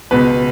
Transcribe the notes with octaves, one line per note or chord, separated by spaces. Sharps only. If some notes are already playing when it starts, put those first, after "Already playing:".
C#2 B2 B3 B4